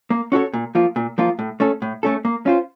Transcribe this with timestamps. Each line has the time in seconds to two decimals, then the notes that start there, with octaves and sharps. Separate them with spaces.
0.10 A#3
0.32 C#4 F#4 A4 C#5
0.53 A#2
0.75 F3 A#3 F4
0.96 A#2
1.18 F3 A#3 F4
1.39 A2
1.60 A3 C#4 A4
1.82 A2
2.03 A3 C#4 A4
2.25 A#3
2.46 C#4 F4 C5